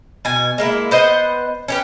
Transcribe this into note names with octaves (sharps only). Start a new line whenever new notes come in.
B2 G#5
G#3 A#3 E4
B3 C5 D#5 F#5
C#4 G4 B4